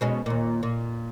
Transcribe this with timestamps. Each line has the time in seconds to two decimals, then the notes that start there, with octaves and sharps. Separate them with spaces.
0.01 B2 G#3 C#4
0.26 D#2 A#2
0.63 A#2